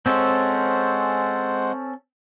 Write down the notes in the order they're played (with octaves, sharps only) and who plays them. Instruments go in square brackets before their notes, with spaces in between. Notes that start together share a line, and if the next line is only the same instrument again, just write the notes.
[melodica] G#3 C5 F#5 [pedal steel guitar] C4 C#4 A4